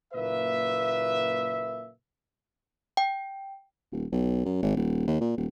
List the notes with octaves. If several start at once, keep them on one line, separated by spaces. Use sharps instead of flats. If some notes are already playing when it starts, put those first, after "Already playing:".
F#1 A#2 A#3 B4 E5
G5
D#1
B1
F#2
G#1
D#1
D#2
A#2
D#1